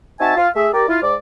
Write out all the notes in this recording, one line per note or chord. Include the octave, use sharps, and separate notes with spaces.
C4 D#4 F#4 E5 G#5 A5
F4
A3 G#4 E5
G4 A#4 D5
E4 F4
G#2 D5